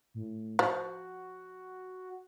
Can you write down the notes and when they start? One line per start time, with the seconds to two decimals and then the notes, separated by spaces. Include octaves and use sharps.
0.14 A2
0.59 F3 F#4